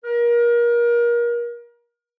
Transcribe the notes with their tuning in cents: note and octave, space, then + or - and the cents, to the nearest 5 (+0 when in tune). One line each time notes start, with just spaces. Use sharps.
A#4 +30